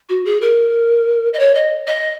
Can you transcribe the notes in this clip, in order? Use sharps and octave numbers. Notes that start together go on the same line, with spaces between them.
F#4
G#4
A#4
D#5
C#5
D#5
D#5